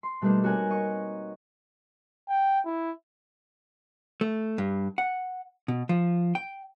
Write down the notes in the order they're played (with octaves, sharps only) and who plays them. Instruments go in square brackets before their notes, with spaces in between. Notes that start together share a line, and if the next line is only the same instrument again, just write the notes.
[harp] C6
B2 G3 A3 A#3 D4 D#4
C4 F#4 A#4 C#5 F#5 G#5
D#5 C#6
[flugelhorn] G5
E4
[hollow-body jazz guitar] A3
G2
F#5
B2
F3
G5